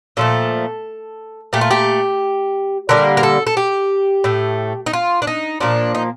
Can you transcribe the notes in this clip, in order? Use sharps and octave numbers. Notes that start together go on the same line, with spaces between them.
A#2 F3 A3 A4
A#2 A3 G4
F4
G4
D3 G3 A#3 A#4
A#4
A4
A4
G4
A2 A3
D#4
F4
D4
D#4
A#2 F3 A#3 D4
D#4